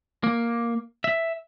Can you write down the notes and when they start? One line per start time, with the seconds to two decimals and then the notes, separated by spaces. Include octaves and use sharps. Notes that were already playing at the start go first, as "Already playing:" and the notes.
0.24 A#3
1.04 E5